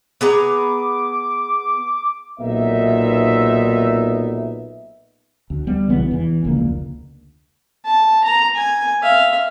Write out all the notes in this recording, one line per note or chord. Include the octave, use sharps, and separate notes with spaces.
B3 G#4 A#5 D6
B1 A#2 B3 D#4 E5
D2
G3 B3
B1 C#3 E3 B3
E2 E3
F1 C#2 D3 A#3
A5
A#5
G#5
E5 F5